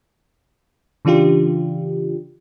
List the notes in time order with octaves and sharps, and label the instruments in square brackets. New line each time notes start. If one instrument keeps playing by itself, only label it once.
[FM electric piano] C#3 E3 D4 F4 G4